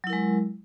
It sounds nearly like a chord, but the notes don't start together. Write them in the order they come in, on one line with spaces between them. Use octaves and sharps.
F#3 E4 A#4 G#3